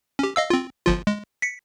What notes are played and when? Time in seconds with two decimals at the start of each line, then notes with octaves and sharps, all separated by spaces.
0.19 C#4 G4
0.36 D#5 F5 E6
0.50 C4 F4
0.86 G1 F3 F4
1.07 G#3
1.42 B6 C#7